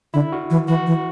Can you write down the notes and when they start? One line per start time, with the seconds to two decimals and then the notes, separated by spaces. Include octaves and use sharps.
0.14 D3 E4
0.32 F#4
0.50 E3
0.68 E3 F#4
0.87 E3